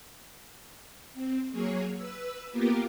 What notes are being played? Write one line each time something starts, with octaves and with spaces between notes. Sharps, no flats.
C4
F#3 A#3 G#4 C#5
B4 E6
A#3 B3 F4 G4 A#4 D6